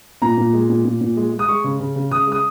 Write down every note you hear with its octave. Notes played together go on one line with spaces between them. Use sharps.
A#2 A#5
A#2
G#3
A#2
A#2
A#2
G#3
G#3
D#6
G#3 C#6
C#3
C#3
C#3
C#3 D#6
G#3 D#6